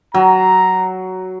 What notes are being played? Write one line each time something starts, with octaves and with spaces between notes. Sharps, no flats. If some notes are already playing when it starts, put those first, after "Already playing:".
F#3 A#5